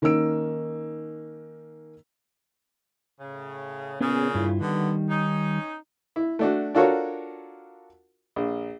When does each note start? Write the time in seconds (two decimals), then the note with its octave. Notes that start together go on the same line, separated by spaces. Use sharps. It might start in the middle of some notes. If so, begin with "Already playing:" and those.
0.02 D#3 A#3 C#4 D#4 E6 D7
3.20 A2 C#3
4.01 A#2 C#3 B3 C#4 G#4
4.35 G2 E4 F4
4.60 D3 D#3 G3 B3
5.09 C#4 D#4
6.16 E4
6.39 A3 D4 F#4
6.75 D4 F4 F#4 A4 A#4 C#5
8.36 A#1